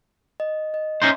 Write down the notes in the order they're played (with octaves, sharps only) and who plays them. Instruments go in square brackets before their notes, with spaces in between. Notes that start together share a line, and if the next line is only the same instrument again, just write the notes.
[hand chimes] D#5
D#5
[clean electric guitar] C#4 D#4 C5 [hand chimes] E5